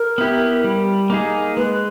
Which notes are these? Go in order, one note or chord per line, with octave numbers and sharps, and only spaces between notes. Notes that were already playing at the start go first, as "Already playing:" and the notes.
Already playing: A#4
B3 E4 G4
G3
A#3 D#4 G#4
G#3 B4